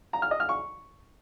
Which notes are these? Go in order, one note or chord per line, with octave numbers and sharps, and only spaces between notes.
A#5
F6
D#5
F6
C#6